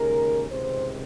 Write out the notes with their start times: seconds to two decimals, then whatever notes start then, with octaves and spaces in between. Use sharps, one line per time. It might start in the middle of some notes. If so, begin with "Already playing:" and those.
Already playing: D#2 C#3 G#3 A#4
0.51 C#2 C3 D#3 C5